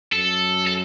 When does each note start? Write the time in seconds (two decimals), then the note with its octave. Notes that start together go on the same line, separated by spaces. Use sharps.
0.12 F#2 A4
0.66 A4